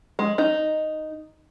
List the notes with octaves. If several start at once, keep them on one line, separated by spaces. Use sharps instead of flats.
G#3
D#4